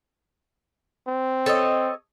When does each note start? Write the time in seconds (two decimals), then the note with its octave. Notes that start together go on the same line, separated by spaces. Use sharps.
1.07 C4
1.46 A4 C#5 D#5